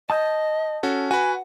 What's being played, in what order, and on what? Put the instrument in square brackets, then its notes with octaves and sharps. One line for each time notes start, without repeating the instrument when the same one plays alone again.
[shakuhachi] D#5 [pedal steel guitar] A5 D#6 G6
[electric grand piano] C#4 F#4 A4
[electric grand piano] F#4 B4 [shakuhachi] F#5 [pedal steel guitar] G#5